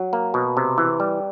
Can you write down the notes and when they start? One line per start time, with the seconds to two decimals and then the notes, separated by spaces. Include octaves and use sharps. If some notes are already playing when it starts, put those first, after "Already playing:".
Already playing: F#3
0.13 A#3
0.34 B2
0.57 C3
0.78 E3
1.00 G3